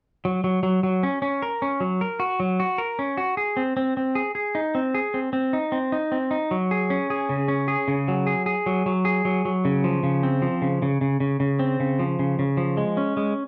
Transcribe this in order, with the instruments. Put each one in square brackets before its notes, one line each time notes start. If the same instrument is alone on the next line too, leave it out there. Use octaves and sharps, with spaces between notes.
[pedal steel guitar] F#3
F#3
F#3
F#3
C#4
C#4
A#4
C#4
F#3
A#4
F#4
F#3
F#4
A#4
C#4
F#4
G#4
C4
C4
C4
G#4
G#4
D#4
C4
G#4
C4
C4
D#4
C4
D#4
C4
D#4
F#3
G#4
C#4
G#4
C#3
C#4
G#4
C#3
F#3
G#4
G#4
F#3
F#3
G#4
F#3
F#3
C#3
F3
C#3
C4
F3
C#3
C#3
C#3
C#3
C#3
C4
C#3
F3
C#3
C#3
F3
G#3
C#4
G#3